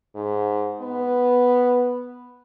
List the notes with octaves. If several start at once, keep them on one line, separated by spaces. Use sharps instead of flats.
G#2
B3